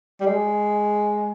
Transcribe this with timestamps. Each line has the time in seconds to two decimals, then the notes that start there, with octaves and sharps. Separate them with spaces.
0.21 G3
0.26 G#3